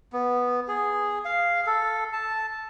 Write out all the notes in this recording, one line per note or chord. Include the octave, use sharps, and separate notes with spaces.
B3
G#4
F5
A4
A5